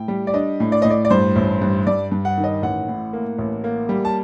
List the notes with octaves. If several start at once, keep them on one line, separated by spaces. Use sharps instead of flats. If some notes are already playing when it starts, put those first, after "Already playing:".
Already playing: A2 G5
G3
D5
D4 D#5
A2
D5
A2 D#5
D5
D5
G2 C5
A1
G2
G2 D5
G2
F#5
D#3
D#5
A1 F#5
A2
A#3
A1
A#3
G3
A5